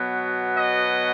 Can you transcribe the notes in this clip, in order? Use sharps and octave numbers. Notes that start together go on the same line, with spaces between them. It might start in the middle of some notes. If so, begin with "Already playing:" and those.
Already playing: B2 F#3 B3
D#5